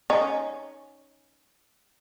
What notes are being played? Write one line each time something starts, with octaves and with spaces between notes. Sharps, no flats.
C#4 D#4